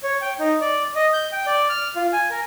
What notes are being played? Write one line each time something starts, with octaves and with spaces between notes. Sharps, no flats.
C#5
G5
D#4
D5
D#5
G6
G5
D5
F6
F4
G#5
A#4